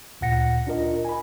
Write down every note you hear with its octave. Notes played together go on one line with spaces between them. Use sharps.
D2 A#2 F#5 A#6 C#7
D4 F4 A#4 D#5
G#5 B5